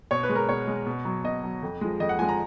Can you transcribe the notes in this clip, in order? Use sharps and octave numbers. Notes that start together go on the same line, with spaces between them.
B2 C#5
B4
G#3
A#4
B2 C#5
G#3
B2
F#3
B2 D#5
F#3
F2
F3 G#3
F2 D#5
F#5
F3 G#3 G#5
A#5